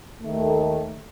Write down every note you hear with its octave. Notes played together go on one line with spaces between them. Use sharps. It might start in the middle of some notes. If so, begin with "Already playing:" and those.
D#2 D#3 A3